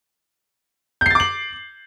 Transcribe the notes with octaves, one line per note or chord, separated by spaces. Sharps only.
D6 G6 A6 C7 F#7